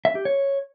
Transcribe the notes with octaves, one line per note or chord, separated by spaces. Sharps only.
E5
G4
C#5